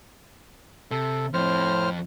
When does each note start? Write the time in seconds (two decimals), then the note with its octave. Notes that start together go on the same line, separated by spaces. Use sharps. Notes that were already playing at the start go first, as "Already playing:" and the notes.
0.91 C3 A4
1.34 F2 A2 C5 F6